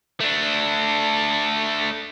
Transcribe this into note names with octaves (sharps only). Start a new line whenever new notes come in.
A3 D4